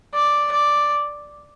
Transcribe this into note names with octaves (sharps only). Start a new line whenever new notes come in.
D5
D5